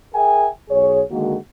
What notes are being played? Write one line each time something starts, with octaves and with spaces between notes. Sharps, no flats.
G#4 A#4 E5 G5 G#5
B1 G#4 C#5
D3 D#3 G#3 A#3 F#4